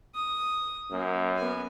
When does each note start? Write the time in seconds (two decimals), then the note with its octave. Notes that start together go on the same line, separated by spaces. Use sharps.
0.15 D#6
0.91 F#2 A#3
1.37 B3 G#5